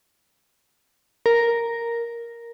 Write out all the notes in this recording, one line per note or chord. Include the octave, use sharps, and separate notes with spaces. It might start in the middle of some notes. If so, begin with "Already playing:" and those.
A#4